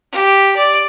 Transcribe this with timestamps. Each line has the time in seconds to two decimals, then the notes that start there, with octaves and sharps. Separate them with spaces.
0.12 G4
0.57 D5